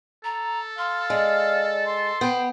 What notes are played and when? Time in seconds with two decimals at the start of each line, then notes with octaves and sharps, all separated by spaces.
0.24 A4 A#5
0.78 F5 C6
1.10 G#3 D5
1.86 C6
2.21 B3 C5 G5